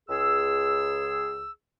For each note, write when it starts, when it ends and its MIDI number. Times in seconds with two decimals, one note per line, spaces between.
0.09 1.50 37
0.09 1.50 68
0.09 1.50 88